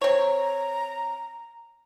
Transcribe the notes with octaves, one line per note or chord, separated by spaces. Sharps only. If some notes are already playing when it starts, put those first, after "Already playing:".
C4 C#5 A#5